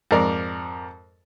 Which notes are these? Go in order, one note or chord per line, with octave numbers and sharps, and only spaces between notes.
F2 G#2 A#4 D5